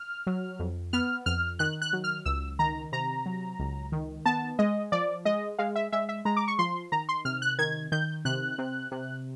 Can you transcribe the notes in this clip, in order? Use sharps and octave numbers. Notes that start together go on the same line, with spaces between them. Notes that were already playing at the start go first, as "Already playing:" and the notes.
Already playing: F6
F#3
F2
B3 F6
F2 F6
D#3 F#6
F#6
F#3
F6
C#2 E6
D#3 A#5
C3 A#5
F#3
C#2
D#3
B3 A5
G#3 D#5
F3 D5
G#3 D#5
G#3 F5
E5
G#3 E5
E5
G#3 A#5
D6
C#6
F3 C6
D#3 A#5
C6
C3 F6
F#6
D#3 G#6
D#3 G6
C3 F#6
C3
C3